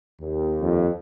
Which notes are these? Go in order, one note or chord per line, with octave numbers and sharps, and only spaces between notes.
D#2
F2